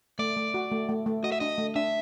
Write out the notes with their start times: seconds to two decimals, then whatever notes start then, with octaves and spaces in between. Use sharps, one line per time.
0.19 A3 D5
0.36 A3
0.54 F#4
0.71 A3
0.89 A3
1.06 A3
1.23 F#4 D#5
1.32 E5
1.40 D4 D#5
1.58 A3
1.76 D4 E5